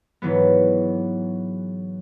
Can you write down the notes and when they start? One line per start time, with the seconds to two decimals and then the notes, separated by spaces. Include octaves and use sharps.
0.22 G#2 E3 F#3 B3